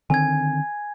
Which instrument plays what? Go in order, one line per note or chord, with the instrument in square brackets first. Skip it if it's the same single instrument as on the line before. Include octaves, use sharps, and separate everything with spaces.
[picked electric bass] D3 D#3 C4 [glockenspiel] G#5 G#6